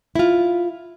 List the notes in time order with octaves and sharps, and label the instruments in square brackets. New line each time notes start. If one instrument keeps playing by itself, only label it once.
[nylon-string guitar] E4 F4